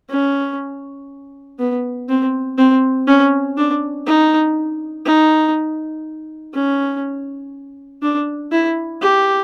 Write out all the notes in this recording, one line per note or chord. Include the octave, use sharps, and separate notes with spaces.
C#4
B3
C4
C4
C#4
D4
D#4
D#4
C#4
D4
E4
G4